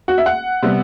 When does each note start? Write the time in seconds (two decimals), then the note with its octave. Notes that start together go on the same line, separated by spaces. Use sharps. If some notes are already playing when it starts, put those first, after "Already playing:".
0.08 F#4
0.18 E5
0.26 F#5
0.62 C3 G3 B3